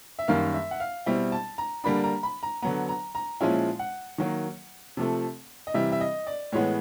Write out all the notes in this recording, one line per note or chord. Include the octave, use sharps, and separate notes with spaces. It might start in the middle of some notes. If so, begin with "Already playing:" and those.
E5
F#2 D#3 G3 A#3 F5
E5
F#5
F5
B2 G3 C4 E4
A5
A#5
D3 G3 A#3 D4 B5
A#5
B5
A#5
D3 F#3 B3 A#5
A#5
A#5
A#2 F3 G#3 C#4 E4 F5
F#5
D#3 F#3 A#3
C3 F3 A3
D#5
C3 E3 G3 E5
E5
D#5
D5
A2 E3 G#3 B3 C#5